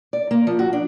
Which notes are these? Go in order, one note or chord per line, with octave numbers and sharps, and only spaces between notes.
D5
A#3
F3
F#4
D4